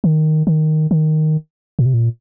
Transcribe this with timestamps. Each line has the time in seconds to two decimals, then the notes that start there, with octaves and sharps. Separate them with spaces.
0.04 D#3
0.47 D#3
0.91 D#3
1.79 A#2
1.86 C3
1.94 A#2